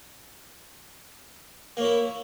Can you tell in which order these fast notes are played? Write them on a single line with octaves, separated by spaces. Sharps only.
A#3 C#5 E4